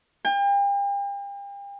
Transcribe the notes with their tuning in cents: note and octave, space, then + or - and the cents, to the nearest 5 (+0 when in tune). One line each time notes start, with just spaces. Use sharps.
G5 +40